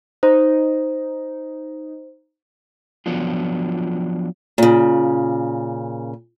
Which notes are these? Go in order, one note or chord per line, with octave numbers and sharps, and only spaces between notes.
D#4 C5
F3 F#3 B3 D4 F4
A#2 C#3